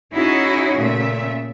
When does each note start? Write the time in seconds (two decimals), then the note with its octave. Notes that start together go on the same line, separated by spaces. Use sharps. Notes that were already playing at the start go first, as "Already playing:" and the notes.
0.13 C#4 D#4 E4 F#4 G#4 C#5
0.78 A#2 C#3 A3 E5